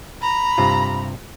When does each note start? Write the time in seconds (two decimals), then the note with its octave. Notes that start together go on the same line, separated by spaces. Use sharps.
0.21 A#5 B5
0.58 G2 C3 F4